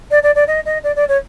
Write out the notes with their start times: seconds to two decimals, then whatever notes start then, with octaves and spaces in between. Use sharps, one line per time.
0.11 D5
0.23 D5
0.35 D5
0.48 D#5
0.65 D#5
0.84 D5
0.96 D5
1.08 C#5